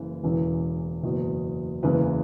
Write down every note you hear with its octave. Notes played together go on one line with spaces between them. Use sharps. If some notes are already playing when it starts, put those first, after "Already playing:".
Already playing: F#1 C#3 E3
E1 E2 C#3 E3
F#1 E2 B2
F#1 E2 C#3 E3 B4